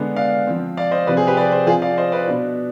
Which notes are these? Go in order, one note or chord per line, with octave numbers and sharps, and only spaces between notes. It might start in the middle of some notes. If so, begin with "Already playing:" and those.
Already playing: D3 G#3 B3 D4
D5 F5
F3 C4
D5 F5
C5 D#5
C3 F3 C4 B4 D5
G#4 C5
G4 B4
B4 D5
G#4 C5
F3 C4 F4 G#4
D5 F5
C5 D#5
B4 D5
B2 B3 D4